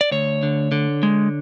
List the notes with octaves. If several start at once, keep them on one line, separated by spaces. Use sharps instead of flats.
D5
D2 C#5
D3
D3
G#3